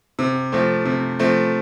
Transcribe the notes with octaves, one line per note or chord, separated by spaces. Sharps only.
C3
F3 A3 C4
C3
F3 A3 C4